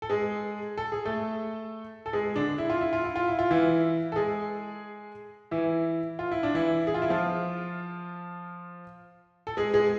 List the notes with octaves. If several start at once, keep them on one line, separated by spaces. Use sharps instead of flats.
A4
G#3 G#4
A4
G#4
A3 A4
A4
G#3 G#4
D3 D4
E4
F4
E4
F4
E4
F4
E4
F4
E3 E4
A4
G#3 G#4
E3 E4
F4
E4
D4
E3 E4
G#4
F4
E4
F3 F4
A4
G#3 G#4
G#3 G#4